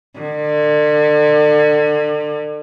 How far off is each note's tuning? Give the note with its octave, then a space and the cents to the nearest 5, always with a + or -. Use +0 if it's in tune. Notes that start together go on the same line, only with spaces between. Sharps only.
D3 +35